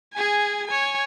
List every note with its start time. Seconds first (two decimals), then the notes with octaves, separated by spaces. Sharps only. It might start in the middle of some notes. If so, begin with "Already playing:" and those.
0.14 G#4 G#5
0.67 C#5 G#5